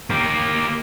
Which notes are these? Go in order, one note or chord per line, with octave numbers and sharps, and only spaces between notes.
A#3 G4